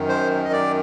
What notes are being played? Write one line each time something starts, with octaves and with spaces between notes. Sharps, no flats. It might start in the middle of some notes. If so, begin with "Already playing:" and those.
Already playing: F#2 D#3
C5
D#5
D5